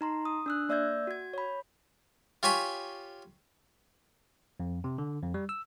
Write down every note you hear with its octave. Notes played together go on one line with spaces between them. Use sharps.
D#4 A#5 C6
D#6
D4 E6 F#6
A#3 D5 E5 E6 G6 G#6
F#4 G#6
C#5 B5
F4 G4 C#5 G#5 B5 C#6
F2
C3
D3
F2
G3
E6